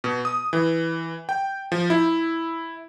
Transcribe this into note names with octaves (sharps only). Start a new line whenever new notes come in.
B2
D#6
E3
G5
F3
E4